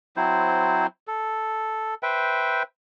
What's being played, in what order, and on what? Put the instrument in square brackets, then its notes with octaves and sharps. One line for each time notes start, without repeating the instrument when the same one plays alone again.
[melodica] F#3 C4 E4 C5
A4
B4 C5 E5 G5